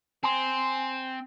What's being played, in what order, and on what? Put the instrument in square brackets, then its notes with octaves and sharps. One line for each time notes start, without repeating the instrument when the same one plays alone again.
[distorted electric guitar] C4 [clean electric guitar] G#5 C6